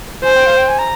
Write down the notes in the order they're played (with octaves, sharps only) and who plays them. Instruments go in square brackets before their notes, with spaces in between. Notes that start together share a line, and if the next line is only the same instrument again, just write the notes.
[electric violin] C5 [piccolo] G#5
[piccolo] G5
F5
G5
G#5
A#5